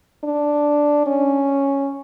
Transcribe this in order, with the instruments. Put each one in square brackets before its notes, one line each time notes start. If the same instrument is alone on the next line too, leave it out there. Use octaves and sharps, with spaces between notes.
[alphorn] D4
C#4